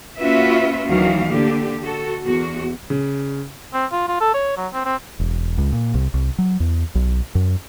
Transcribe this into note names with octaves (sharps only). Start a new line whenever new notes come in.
A#3 C#4 F4 F#4 B4 E5
D2 D#3 E3 F#3 F#4 F5
D3 A#3 G4
F#4 A4
E2 F#4
C#3
C4
F4
F4
A4
C#5
F#3
C4
C4
E1
C#2
A#2
C2
C2
F#3
E2
B1
F#2